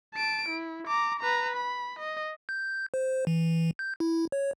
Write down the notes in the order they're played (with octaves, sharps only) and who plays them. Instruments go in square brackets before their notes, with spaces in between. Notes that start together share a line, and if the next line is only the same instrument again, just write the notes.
[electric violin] A5 D7
E4
A#5 D6
B4 A#5
B5
D#5
[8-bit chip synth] G6
C5
E3
G6
E4
C#5